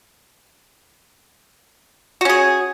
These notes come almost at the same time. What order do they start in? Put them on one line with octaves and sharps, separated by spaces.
F#4 C#4 G#4